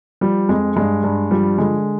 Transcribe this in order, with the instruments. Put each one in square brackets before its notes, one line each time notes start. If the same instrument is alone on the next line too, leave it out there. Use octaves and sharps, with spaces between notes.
[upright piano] F3 G3
F2 G#3
G2 G#3
G2
F3 G3
D3 G#3